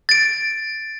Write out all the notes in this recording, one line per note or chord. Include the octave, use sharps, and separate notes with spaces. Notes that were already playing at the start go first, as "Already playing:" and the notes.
A6 D7